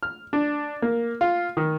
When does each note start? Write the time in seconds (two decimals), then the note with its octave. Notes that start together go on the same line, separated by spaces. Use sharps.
0.03 F6
0.33 D4
0.82 A#3
1.21 F4
1.57 D#3